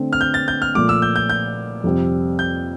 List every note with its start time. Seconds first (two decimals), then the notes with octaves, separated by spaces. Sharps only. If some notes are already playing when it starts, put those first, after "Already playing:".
Already playing: D3 A3 C4
0.13 F6
0.21 G6
0.34 A6
0.48 G6
0.62 F6
0.75 A#2 F3 A3 D6
0.89 E6
1.02 G6
1.16 G6
1.30 G6
1.84 F2 C3 G3 C4
2.39 G6